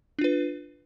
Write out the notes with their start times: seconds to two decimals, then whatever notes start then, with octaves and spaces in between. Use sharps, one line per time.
0.19 D4
0.21 F4
0.24 B4